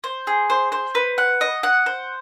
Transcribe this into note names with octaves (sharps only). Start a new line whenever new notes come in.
C5
G#4
C5
C5
B4
F#5
D#5
F#5
C5